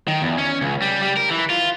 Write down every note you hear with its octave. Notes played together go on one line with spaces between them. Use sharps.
D#3
E2
C#4
C#2
G3
G3
A#4
E3
F4